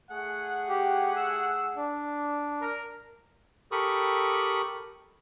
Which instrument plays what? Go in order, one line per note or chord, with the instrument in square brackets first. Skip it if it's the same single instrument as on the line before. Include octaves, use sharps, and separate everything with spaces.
[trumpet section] A3 G#4 F#5
[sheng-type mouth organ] G4
E6
D4
[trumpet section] A#4
[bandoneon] G4 A4 A#4 B5 C#6 D#6